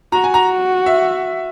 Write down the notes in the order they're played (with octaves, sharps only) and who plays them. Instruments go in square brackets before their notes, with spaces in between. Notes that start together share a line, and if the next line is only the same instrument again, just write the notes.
[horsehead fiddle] F#4 [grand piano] A#5
[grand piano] G#5
A#5
E5